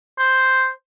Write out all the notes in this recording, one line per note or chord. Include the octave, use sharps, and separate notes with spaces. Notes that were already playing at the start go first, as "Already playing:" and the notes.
C5